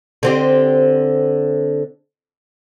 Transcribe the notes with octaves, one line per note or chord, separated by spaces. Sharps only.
D3 C4 G4